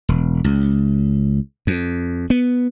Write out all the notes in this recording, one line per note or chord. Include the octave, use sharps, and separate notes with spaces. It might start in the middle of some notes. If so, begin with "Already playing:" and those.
E1
C#2
F2
B3